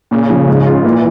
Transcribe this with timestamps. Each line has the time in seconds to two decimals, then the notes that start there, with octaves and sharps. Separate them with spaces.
0.11 A#2 C#3
0.30 F3
0.48 G#2
0.66 F4
0.84 A#2 E3